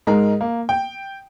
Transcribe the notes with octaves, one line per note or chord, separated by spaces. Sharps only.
G#2 G#3 A#4 A#5
A#3
G5